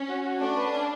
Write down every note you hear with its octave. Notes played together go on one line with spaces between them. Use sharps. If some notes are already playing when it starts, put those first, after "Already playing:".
Already playing: C#4
F#4
F#4
A3 D4
B4
C#4